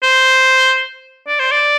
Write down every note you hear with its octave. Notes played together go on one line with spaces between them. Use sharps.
C5
D5
C5
D5